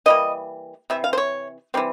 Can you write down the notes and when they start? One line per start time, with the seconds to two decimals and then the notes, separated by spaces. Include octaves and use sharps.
0.06 E3 G3 A#3 D#5
0.90 C3 E3 E5
1.04 F5
1.13 C5
1.18 C#5
1.74 E3 G3 C4